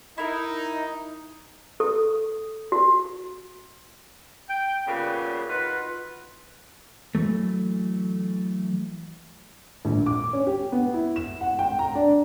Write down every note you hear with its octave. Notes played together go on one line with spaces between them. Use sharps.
D#4 E4 A#4
A4
F#4
G5
A#2 C#3 G3 B3 G4 B4
D#4 F4 F#4 B4
E3 F#3 A3
A#1
D6
C#4
G4
B3
E4
E7
F#5
G5
A#5
D4